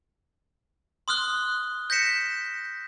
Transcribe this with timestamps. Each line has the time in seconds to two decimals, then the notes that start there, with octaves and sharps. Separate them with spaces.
1.08 C6 D#6 F6 F#6 G7
1.90 G6 A#6 B6 C#7 E7